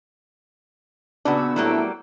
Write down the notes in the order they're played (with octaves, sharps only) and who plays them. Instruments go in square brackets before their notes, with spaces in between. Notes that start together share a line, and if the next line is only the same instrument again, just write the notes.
[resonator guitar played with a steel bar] A#2 C#3 F#4 [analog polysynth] B3 E6 [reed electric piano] D4 B5
[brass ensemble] A2 A3 [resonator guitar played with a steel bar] F#3 G3 A#3